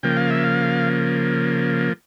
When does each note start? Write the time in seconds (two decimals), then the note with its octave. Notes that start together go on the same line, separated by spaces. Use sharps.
0.03 C#3 F3 A#3 G5
0.16 F5
0.30 E5
0.44 F5